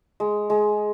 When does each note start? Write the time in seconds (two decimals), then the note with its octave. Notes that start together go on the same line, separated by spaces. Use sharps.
0.20 G#3
0.50 G#3